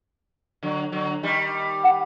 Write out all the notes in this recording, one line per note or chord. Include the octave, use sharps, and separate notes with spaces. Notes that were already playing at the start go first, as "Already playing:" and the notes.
D3 F#3
D3 F#3
D#3 G3
F#5